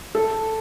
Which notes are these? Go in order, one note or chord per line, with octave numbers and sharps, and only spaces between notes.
A4